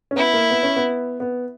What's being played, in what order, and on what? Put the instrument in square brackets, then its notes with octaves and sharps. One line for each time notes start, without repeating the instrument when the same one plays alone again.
[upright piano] C#4
[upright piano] B3 [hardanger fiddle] E4
[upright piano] A#3
B3
C#4
B3
B3